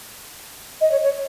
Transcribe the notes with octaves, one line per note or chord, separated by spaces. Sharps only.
D#5
C#5
C#5